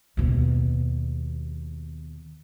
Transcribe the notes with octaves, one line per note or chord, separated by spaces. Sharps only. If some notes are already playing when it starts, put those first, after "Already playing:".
D#2 B2